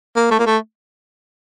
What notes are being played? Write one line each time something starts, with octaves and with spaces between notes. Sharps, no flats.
A#3
A3
A#3
A3